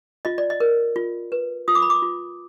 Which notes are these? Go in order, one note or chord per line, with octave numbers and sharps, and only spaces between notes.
F4 D#5
D5
D#5
A#4
F4
B4
F4 D#6
D6
B5
D6
F4